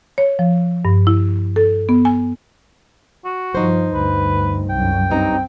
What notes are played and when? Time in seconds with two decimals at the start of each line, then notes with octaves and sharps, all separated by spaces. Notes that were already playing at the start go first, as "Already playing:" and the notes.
0.18 C#5
0.39 F3
0.85 G2
1.07 E4
1.56 A4
1.89 B3
2.05 G#5
3.25 F#4
3.55 G2 F3 D#4 C5
3.94 D2 G2 B4
4.70 C2 F#2 G5
5.10 G2 C4 D#4 A#5